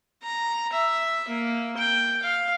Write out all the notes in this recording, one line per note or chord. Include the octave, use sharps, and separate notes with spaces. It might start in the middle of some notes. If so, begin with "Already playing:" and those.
A#5
E5
A#3
G5
F5